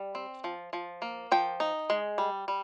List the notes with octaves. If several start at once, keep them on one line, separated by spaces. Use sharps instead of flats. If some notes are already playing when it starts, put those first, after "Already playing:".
Already playing: G3
C4
F3
F3
A#3
F3 G5
D#4
G#3
G3
G3